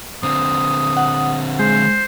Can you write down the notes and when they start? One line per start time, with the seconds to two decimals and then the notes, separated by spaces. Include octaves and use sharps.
0.23 D3 C4 D#6
0.97 F#5
1.59 G#3 C5